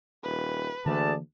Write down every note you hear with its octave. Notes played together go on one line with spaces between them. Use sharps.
D#1 B4
D2 D3 E3 A#3 G#4 D5 A5